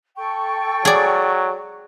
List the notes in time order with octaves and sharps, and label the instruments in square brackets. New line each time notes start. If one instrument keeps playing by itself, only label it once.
[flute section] A4 G5 C#6
[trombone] F#3 [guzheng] G#4 D5